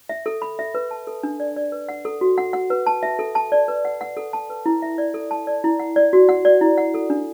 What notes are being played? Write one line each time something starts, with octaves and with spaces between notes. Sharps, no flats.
E5
A4
B5
E5
B4
A5
A4
D4
D5
D5
B4
F#5
A4
F#4
F#5
F#5
B4
A5
E5
A4
A5
D5
B4
F#5
F#5
A4
A5
B4
E4
E5
D5
A4
A5
D5
E4
F#5
D5
F#4
F#5
D5
E4
F#5
A4
D4